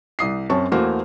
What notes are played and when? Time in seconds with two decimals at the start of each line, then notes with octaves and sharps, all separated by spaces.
0.19 C2 D#6 C7
0.50 F#2 C4 C#4 A5 C#6
0.72 E2 A3 A#3 F#4 C5 F6